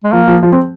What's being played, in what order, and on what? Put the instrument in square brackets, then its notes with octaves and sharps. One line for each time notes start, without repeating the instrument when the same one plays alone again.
[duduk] G#3
[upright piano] F3 [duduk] A#3
[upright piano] F3
F3
C4